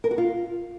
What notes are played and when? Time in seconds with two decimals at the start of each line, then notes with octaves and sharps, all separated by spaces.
0.04 A#4
0.11 F#4
0.18 F4